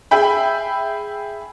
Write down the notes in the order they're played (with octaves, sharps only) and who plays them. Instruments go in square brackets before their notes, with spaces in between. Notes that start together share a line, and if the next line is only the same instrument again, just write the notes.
[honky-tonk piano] G#4 E5 G5 B5